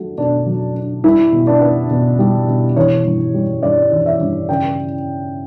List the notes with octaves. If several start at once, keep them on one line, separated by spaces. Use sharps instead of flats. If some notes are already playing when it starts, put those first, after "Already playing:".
Already playing: F#3 A3 D4 F#4
B2 D4
F#3
D4
G3 E4
B2
D4
B3
B2
G3
B2
E3 C#5
G2
G3
G2 D5
E3
E5
G2
C#3 G5